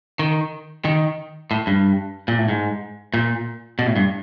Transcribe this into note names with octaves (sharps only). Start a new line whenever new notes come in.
D#3
D#3
A2
G2
A#2
A2
G#2
A#2
B2
A2
G2